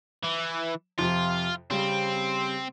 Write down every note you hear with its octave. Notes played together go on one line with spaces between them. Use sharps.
E3
F2 C3 F3 F4
C#3 G3 C4